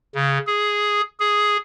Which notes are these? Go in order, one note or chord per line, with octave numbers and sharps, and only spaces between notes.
C#3
G#4
G#4